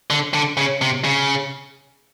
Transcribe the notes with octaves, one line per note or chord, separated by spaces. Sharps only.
D3
D3
C#3
C3
C#3